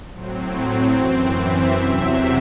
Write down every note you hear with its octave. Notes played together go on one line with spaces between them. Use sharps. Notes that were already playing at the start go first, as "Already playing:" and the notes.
A2 F#3 C4
F#2 E3 C4
E5
E2 C3 F#3 C4 E5